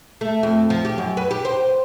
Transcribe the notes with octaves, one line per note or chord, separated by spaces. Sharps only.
A3
F2
F3
G4
F#2
B4
G4
C5